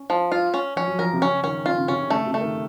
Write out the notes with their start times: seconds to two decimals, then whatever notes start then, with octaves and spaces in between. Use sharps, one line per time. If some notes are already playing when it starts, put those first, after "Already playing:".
Already playing: C#4
0.10 F3
0.32 F4
0.54 C#4
0.76 F3 C#4
0.88 F#3
0.99 F3 A#4
1.13 C3
1.21 C#3 C#4
1.43 D#3 C#4
1.66 C#3 F4
1.78 C#3
1.88 C3 C#4
2.00 C#3
2.10 C#3 A3
2.26 C3
2.34 A3
2.41 D#3